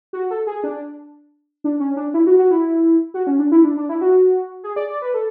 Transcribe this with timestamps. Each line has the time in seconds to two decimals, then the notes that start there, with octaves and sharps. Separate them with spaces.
0.13 F#4
0.31 A4
0.47 G#4
0.64 D4
1.64 D4
1.80 C#4
1.96 D4
2.14 E4
2.27 F#4
2.39 F#4
2.51 E4
3.14 F#4
3.27 C#4
3.39 D4
3.52 E4
3.64 D4
3.77 D4
3.89 E4
4.01 F#4
4.63 G#4
4.76 D5
4.90 D5
5.02 B4
5.14 A4